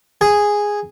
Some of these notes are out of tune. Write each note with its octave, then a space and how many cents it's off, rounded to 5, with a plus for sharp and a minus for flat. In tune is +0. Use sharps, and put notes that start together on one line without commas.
G#4 -5